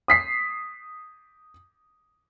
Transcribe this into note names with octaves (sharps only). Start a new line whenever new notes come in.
D#6 B6 C7